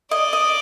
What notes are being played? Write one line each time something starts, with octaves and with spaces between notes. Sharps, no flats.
D5 D#5
D#5